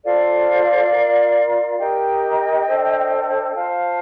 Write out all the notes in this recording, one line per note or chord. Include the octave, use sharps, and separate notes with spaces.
F4 A4 C5 D5 F5
F4 A#4
D#4 G4 A#4 D#5 G5
D4 A4 C5
F4 C5 F5 A5